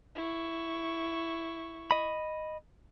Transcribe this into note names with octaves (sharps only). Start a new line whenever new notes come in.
E4 C#6
D#5 B5